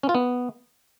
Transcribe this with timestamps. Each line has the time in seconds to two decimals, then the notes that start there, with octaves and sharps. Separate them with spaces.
0.03 C#4
0.09 F4
0.15 B3